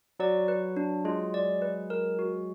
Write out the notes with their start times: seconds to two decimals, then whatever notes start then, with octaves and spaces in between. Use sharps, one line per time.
0.20 F#3 D5
0.48 B4
0.77 D4
1.05 G#3 F4
1.34 D5
1.62 B4
1.90 A#4
2.19 F#4